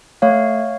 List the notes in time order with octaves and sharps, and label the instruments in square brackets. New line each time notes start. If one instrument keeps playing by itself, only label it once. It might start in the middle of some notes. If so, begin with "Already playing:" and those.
[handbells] A3 C#5 F5